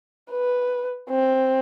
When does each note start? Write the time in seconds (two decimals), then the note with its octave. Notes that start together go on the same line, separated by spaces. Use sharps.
0.31 B4
1.10 C4